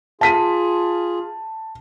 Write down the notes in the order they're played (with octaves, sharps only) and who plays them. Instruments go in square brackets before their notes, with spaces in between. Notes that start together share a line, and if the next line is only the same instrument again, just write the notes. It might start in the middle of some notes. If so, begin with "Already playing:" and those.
[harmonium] F4 G#4 [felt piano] A5 B6 D#7